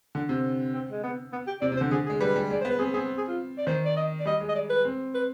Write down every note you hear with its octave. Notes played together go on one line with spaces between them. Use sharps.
D3
C3
C4
G#3
B3
B3
G4
C3 D5
C3
C5
D3
D3 G#4
G#4
G#3
G3 B4
G3
G#3 D5
B3 C5
B4
C4 G#4
C4 G#4
G#4
F4
D5
D#3 C5
D5
D#5
D5
G3 D#5
G#3
D#5
D5
B4
C4
B4